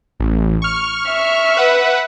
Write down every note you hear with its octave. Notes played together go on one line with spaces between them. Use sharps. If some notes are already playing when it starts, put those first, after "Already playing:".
A1
C#6 F6
E5
B4 F#5